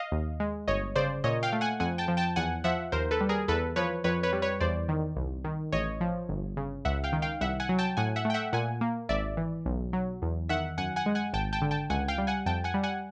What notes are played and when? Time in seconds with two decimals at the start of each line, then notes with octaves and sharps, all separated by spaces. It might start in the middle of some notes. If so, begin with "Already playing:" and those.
Already playing: D#5 F5
0.12 D#2
0.40 G#3
0.68 G1 C#5 D#5
0.96 C#3 C5 D5
1.24 A#2 C#5 D#5
1.43 F5 G5
1.53 A3
1.61 F#5 G#5
1.80 F2 F#5 G#5
1.98 G5 A5
2.08 F3
2.17 G5 A5
2.36 E2 F#5 G#5
2.64 F3 E5 F#5
2.92 D#2 A#4 C5
3.11 A4 B4
3.21 G3
3.29 G#4 A#4
3.48 E2 A4 B4
3.76 F3 B4 C#5
4.04 F2 B4 C#5
4.23 B4 C#5
4.33 G3
4.42 B4 C#5
4.60 E2 C5 D5
4.89 D#3
5.16 C2
5.45 D#3
5.73 A1 C#5 D#5
6.01 F3
6.29 G1
6.57 C#3
6.85 C#2 E5 F#5
7.04 F5 G5
7.13 D#3
7.22 F5 G5
7.41 C2 E5 F#5
7.60 F#5 G#5
7.69 F#3
7.79 G5 A5
7.97 A2 F#5 G#5
8.16 E5 F#5
8.25 A3 G5
8.34 E5 F#5
8.53 A#2 F#5 G#5
8.81 A#3
9.09 G#1 D5 E5
9.37 E3
9.66 B1
9.93 F#3
10.22 E2
10.49 D#3 E5 F#5
10.78 F#2 F#5 G#5
10.96 F#5 G#5
11.06 G#3
11.15 F#5 G#5
11.33 G#1 G5 A5
11.53 G5 A5
11.62 D3
11.71 G5 A5
11.90 C#2 F#5 G#5
12.08 F5 G5
12.18 G3
12.27 F#5 G#5
12.46 F2 G5 A5
12.64 F#5 G#5
12.74 G3
12.83 F#5 G#5